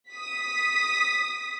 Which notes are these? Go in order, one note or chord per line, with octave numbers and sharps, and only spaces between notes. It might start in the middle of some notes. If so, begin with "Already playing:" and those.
D#6 B6